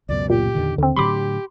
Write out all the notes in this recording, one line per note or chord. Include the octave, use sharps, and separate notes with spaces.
C#2 F#2 B2 D5
A#2 G4
E2 D3 D#3
D#2 D3 C4
A2 D3 F#3 G4 B5 C6 D6